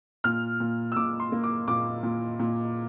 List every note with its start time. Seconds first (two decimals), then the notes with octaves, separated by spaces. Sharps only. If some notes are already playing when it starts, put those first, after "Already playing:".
0.24 A#2 F6
0.60 A#2
0.92 E6
0.96 A#2 D6
1.20 C6
1.32 A#3
1.44 D6
1.68 A#2 D6
2.03 A#2
2.40 A#2